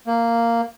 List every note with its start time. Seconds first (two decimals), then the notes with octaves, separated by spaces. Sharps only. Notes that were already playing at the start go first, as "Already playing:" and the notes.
0.07 A#3